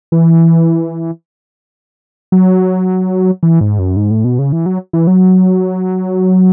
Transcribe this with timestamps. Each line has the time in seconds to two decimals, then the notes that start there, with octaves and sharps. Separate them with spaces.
0.12 E3
2.32 F#3
3.43 E3
3.61 G#2
3.79 F#2
3.97 G#2
4.11 A2
4.24 B2
4.39 C#3
4.52 E3
4.66 F#3
4.93 E3
5.07 F#3